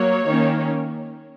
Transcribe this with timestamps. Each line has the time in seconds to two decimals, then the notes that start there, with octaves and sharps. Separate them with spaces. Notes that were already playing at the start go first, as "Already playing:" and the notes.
Already playing: F#3 A#3 C#5
0.28 D#3 A#3 C#4